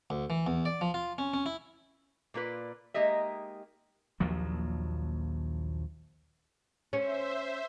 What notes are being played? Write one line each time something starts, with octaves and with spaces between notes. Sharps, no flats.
D2
E3
E2
D5
F3
F4
C#4
C#4
E4
A#2 A#3 F4 B4 D5
G#3 A#3 D#4 G4 D#5 E5
A#1 D#2 F3 F#3
C#4 C5 E5